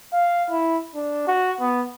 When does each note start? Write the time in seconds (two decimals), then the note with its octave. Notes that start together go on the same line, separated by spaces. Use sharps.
0.13 F5
0.51 E4
0.95 D4
1.28 F#4
1.61 B3